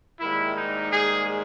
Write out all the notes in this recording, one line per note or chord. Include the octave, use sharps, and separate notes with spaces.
G#2 D#3 G3 A#3 E4
D#4
G#4